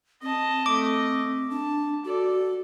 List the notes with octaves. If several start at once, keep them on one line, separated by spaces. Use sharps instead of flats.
C4 D#5 A5
A3 D#5 D6
D4 A5
F#4 A4 D5